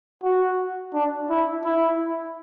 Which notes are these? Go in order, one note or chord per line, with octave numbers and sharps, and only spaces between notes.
F#4
D4
E4
E4